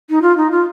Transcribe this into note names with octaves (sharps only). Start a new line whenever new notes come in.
D#4
F4
D#4
F4